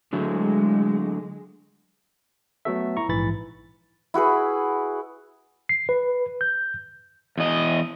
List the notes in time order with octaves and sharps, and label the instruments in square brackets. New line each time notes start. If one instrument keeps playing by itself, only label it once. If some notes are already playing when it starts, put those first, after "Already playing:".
[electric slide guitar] D3 F#3 A3 [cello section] G#3
[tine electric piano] F#3 A3 B3 F#4 A4 E5
E4 A#5 C#6
A#1 G#2 E3 B5 A6
[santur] E4 F#4 G#4 B4
[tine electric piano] C7
B4
G6
[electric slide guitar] E2 D#5